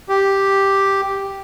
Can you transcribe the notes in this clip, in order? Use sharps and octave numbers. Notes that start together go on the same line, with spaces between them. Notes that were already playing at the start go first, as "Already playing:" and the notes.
G4